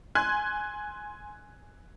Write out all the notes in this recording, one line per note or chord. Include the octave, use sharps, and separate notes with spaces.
G#5 C6 F#6 G#6